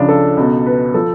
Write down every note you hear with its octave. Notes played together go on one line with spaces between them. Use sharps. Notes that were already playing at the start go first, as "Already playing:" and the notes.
Already playing: C#2 C#3 F3 D4 F4
A4
C#2 B2
B4
F3 A4